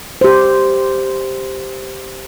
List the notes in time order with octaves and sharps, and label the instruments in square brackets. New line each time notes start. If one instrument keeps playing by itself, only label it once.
[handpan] G4 C5